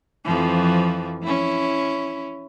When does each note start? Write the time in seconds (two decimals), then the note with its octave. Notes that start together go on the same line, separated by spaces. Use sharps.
0.25 F2 E3 F3
1.22 C#4 E4